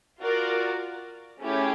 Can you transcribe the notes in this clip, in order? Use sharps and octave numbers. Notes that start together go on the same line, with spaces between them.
F4 F#4 A#4 D5
A3 C#4 E4 G4 G#4